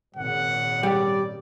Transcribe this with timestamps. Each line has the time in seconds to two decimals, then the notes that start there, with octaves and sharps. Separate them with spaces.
0.16 G#1 A#2 C#3 F#5
0.83 G3 D5